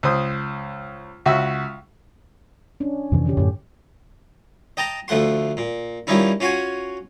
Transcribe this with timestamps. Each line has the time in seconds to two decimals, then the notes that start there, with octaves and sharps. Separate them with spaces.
0.03 C#2 C5 D#6
1.26 C#2 F#4 E5
2.80 C#4 D4
3.12 F2 C3 E3
3.25 D3 C#4 G4
3.37 F#2 A2 D3 G4
4.77 D#5 G5 A5 A#5
5.08 D2 F3 A3 F#5 C6
5.57 A#2
6.07 D#3 F3 G3 C#4 D#4 E4
6.40 C#4 F4 F#4 F#5 G#5